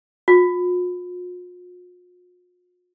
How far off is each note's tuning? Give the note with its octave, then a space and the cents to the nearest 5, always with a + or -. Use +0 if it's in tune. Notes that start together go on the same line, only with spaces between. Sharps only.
F4 +45